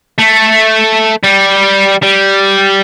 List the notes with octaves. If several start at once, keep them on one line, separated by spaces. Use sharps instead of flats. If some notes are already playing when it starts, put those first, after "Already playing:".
A3
G3
G3